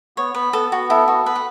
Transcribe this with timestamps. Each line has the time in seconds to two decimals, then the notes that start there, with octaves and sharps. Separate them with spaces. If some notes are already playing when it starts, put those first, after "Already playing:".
0.17 B3 C#5
0.35 B3 B4
0.53 B3 A4
0.72 B3 F#4
0.90 E4 A4
1.07 B3 F#4
1.26 B3 B4
1.36 F#5